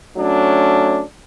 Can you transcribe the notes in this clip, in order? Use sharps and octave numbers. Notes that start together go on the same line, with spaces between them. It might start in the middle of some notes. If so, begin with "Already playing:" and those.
F#3 A3 C#4 D4